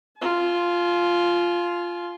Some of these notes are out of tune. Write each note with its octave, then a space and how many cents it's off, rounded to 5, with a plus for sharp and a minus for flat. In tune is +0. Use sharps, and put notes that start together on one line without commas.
F4 +0 G#5 +45